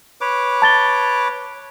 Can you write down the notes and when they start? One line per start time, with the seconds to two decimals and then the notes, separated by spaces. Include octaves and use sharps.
0.21 B4 C#5 D6
0.62 A5 A6 G7